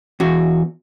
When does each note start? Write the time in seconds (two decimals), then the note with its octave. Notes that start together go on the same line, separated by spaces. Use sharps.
0.20 E2 F#4